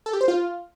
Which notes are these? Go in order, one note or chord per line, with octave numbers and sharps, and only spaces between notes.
A4
G4
C5
F4